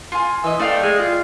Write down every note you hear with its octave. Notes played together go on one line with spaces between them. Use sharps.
F4 G#5
E3 D#5 E6
A3 D5 F5 G5
G#3
F4